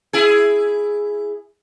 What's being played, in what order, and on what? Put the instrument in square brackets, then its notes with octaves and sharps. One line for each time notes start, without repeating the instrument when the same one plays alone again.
[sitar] E4 G#4